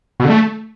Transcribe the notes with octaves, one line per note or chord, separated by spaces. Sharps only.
B2
D3
A3